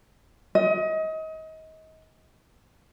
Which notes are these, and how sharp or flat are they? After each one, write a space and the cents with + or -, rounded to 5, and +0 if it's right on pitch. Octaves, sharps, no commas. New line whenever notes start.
D#5 +30